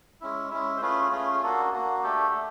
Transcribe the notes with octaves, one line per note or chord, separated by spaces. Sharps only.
G#3 C#4 E4
G#3 C#4 E4
C5
A3 C#4 F4 G#4 B4
A3 C#4 F4 G#4
G#4
A#3 D4 F#4 A4
A#3 D4 F#4
A3 D4 G4 A4
A3